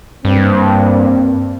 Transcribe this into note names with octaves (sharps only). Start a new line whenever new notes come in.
G2 A#3 C4